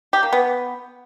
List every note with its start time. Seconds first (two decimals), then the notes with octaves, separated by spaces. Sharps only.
0.13 G4
0.23 A#3
0.33 B3